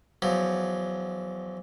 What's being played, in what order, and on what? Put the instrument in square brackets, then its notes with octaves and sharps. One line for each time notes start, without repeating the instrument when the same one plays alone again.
[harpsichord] E2 F3 F#3